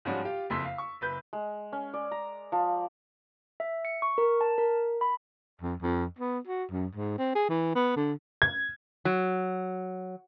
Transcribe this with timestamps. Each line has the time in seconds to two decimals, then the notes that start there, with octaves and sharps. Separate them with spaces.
0.05 G#2 F3 G3 G#3 C#4 F#4
0.25 F4 G4
0.50 F#1 F2 C6 E6 B6
0.65 F5
0.78 C#6
1.01 F#1 B4 G6
1.33 G#3
1.73 C#4
1.94 D5
2.11 A#5
2.52 F3
3.60 E5
3.85 C#7
4.02 C#6
4.18 A#4
4.41 A5
4.58 A#4
5.01 B5
5.61 F2
5.82 F2
6.19 B3
6.47 F#4
6.71 F#2
6.95 G#2
7.18 C4
7.35 G#4
7.49 E3
7.75 B3
7.96 D3
8.42 G#6
9.05 F#3